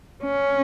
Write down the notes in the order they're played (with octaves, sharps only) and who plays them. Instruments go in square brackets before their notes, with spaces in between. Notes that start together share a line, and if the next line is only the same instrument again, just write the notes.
[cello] C#4